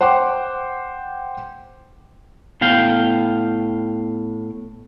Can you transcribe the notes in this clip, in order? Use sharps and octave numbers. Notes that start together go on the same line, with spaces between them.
C5 F#5 G5 C6 D6
A2 B3 F5 G5